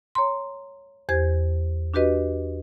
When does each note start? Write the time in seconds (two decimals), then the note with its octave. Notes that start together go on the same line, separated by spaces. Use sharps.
0.15 C#5 A#5 C6
1.09 E2 G4 C5 G#6
1.94 D4 F#4 G4 B4 D#5